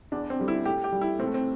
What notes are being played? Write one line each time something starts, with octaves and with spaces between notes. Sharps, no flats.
E2 D4
C4
D3 G3
E4
A2 G4
G4
G3
E4
A2 C4
A3
C4